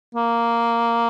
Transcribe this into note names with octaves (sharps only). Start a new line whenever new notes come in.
A#3